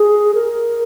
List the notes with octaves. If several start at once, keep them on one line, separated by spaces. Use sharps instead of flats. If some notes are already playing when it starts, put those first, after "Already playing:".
Already playing: G#4
A#4